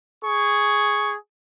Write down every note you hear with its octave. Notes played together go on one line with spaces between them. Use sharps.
G#4 C#6